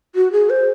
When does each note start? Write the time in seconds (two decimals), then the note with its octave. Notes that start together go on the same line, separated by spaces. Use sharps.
0.15 F#4
0.32 G#4
0.50 C5